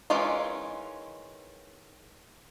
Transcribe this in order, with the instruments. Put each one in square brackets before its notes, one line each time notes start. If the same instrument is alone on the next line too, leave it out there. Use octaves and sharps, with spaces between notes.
[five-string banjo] D#3 E3 G#3 C#4 F4